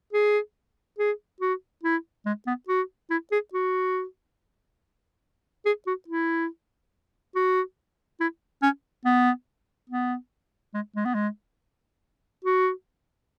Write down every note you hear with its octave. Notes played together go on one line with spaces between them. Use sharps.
G#4
G#4
F#4
E4
G#3
B3
F#4
E4
G#4
F#4
G#4
F#4
E4
F#4
E4
C#4
B3
B3
G#3
G#3
B3
G#3
F#4